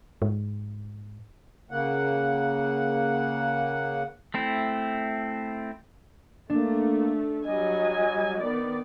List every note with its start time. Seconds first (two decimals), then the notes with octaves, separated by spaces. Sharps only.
0.22 G#2
1.71 C#3 A#3 F#5
4.34 A3 C4 E4
6.50 A3 A#3 D4
7.45 F#3 G3 D#5 G#5
8.39 D#3 B3 D5